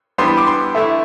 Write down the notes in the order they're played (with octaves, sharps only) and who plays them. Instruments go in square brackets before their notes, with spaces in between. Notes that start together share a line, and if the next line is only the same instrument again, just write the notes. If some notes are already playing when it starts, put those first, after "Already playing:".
[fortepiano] E3 G3 B3 D4 G4 [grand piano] C6
[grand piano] B5
D6
C6
[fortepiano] D3 A3 E4 [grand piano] E5